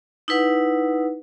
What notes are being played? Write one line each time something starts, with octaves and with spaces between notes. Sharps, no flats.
D#4 E4 B4 F#5